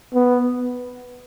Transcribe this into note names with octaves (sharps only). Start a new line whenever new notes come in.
B3